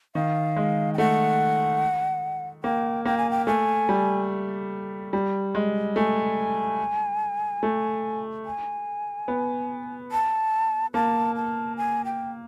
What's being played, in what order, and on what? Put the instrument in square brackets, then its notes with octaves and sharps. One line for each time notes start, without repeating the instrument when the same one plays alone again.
[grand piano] D#3 [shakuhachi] F5
[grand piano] G#3
[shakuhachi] G5
[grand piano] A3 [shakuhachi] F#5
[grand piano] A#3 [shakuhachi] G5
[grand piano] A#3 [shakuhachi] G5
[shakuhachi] G#5
G5
[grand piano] A3 [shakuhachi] G#5
[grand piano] G3
G3
G#3
[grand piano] A3 [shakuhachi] G#5
[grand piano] A3
[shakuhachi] G#5
[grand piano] B3
[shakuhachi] A5
[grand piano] A#3 [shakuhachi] A5
[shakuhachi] A5
G#5
G5